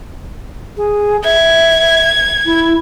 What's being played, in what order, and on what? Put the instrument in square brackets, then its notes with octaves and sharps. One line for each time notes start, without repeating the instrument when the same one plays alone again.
[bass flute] G#4
[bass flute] E5 [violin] G#6
[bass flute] E4